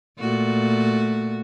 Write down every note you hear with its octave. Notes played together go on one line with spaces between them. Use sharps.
A#2 A3 F#4